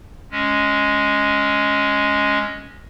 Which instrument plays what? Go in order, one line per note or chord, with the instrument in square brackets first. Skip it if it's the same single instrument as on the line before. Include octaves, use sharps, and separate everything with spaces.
[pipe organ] G#3 C#4